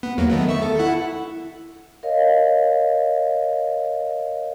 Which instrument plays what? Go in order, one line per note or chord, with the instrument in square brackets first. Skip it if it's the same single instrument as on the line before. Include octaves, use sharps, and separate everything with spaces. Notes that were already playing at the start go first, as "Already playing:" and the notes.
[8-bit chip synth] B3
E2 F#3 A#3
D#3 A3 B3
E5 C#6
A4
E4 F#5
[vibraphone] A#4 C#5 D#5 F5